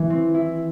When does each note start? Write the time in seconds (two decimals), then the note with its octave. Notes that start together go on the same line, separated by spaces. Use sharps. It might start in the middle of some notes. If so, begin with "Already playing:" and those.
Already playing: E3
0.10 C4
0.34 E4